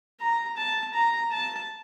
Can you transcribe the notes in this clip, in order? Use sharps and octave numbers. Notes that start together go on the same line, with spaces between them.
A#5
A5
A#5
A5